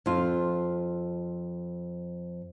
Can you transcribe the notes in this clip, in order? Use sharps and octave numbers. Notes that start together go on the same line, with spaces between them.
F2 F4